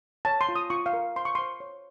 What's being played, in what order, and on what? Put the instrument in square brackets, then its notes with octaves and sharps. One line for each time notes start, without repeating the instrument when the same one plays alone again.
[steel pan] C#5 A5
C6
F4
D#6
F4 C#6
F5
A#4
C5 C6
C#6
C5 C6
C#5